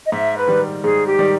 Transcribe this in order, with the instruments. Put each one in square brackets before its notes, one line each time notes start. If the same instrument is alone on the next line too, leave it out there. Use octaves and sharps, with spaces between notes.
[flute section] D#5
[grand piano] G#2 [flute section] E5
[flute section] B4
[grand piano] D#3 G3
[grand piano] G#2 [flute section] G#4
[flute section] G4
[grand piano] D#3 G3